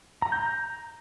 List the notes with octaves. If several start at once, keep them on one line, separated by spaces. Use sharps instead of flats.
A#5
G6
A#5